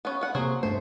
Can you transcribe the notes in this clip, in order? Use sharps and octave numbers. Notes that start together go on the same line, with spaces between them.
B3 C#4
B3 F#5
C3 F#3 A#3 G#4 C5
G2 A3 C5